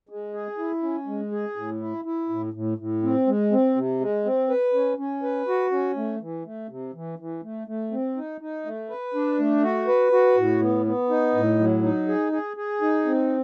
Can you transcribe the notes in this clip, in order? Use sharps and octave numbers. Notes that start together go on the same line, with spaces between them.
G#3
G#4
E4
C#4
G#3
G#4
A2
E4
E4
A2
A2
A2
C4
G#3
C4
C3
G#3
C4
B4
C#4
C#4
B4
F#4
C#4
A3
E3
A3
C3
E3
E3
A3
A3
C4
D#4
D#4
A3
B4
D4
A3
F#4
B4
F#4
A2
B3
B3
D#4
A2
F#3
D#4
G#4
G#4
G#4
D#4
C4